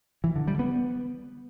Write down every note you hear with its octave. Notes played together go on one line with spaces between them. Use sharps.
E3
D3
G3
B3